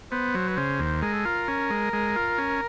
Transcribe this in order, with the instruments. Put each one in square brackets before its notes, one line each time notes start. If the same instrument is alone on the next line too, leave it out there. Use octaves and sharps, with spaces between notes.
[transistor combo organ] B3 [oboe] C5
[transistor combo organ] F#3
[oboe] B4
[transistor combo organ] C#3 [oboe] C5
[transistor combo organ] D#2
[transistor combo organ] G#3 [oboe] A#4
[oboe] A4
[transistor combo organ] F4 [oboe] A#4
[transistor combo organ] C#4
G#3
G#3
F4
C#4